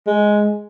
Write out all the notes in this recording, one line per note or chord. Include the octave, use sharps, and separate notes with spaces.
G#3